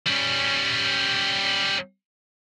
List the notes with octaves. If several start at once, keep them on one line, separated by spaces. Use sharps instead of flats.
G3 C#4